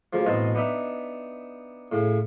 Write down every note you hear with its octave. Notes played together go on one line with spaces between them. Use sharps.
D2 C#3 F3
A1 B2 C4 D#5 A5
B3 D4 D#4 E5
A2 C#3